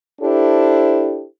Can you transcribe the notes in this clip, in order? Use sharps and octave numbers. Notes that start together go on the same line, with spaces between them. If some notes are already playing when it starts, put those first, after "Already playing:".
D4 E4 G4 A4 C5